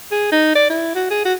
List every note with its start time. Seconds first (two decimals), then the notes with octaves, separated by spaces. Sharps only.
0.11 G#4
0.32 D#4
0.55 D5
0.70 E4
0.95 F#4
1.10 G#4
1.25 F#4